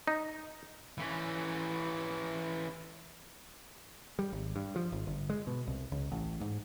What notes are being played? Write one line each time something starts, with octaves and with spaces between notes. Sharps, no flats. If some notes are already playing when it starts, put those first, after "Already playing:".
D#4
E3 C#4
G3
G#1
G2
F3
G#1
G1
G#3
B2
C2
C#2
A1
G#2